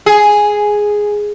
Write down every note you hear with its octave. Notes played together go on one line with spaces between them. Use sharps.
G#4